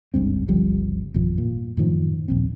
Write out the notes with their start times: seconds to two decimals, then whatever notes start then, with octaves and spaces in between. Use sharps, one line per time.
0.14 F#1 C#2 G2 C4
0.48 G1 C#2 F3 G3
1.14 G#1 F2 B2 F3
1.38 A#2
1.77 F#2 A2 D#3 F3
2.28 D#1 A#1 C4